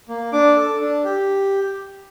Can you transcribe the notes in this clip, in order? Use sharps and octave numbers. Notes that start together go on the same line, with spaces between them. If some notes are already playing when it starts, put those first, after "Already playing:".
A#3
D4 D6
A4
D4
G4